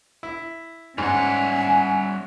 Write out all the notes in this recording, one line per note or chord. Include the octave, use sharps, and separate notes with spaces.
E4
G#2 G3 C#4 E5 F#5 G#5